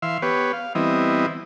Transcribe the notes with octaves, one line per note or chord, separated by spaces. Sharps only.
E3 E5 F5 C6
B3 G4 B4 C#5
F5
E3 G3 B3 C4 E4 D#5